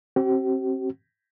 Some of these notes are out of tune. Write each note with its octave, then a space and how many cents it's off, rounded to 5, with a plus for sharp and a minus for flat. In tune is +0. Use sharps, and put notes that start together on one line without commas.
C4 +30 G4 -45